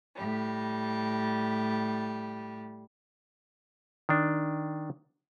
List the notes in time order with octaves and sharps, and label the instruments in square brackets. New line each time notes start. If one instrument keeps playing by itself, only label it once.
[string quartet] A2 G3
[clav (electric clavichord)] D#3 D4